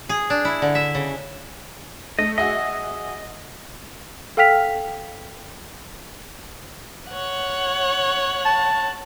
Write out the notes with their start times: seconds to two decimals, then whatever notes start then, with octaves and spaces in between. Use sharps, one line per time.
0.09 G#4
0.30 D4
0.45 E4
0.62 D3
0.75 E5
0.95 C#3
2.19 A3 D#5
2.38 F#4 G#4 D#5 E5
4.37 A4 F5 G5 F6 B6 F7
7.10 C#5 F#5
8.45 A5